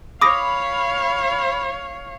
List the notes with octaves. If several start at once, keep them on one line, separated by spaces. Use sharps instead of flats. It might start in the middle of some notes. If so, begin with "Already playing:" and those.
C#5 F5 B5 D6 D#6 A#6